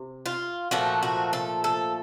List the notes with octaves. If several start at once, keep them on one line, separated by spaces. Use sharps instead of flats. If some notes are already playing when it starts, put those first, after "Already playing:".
Already playing: C3
F4
A#2 F3 A3 F#4
F#4
A4
A4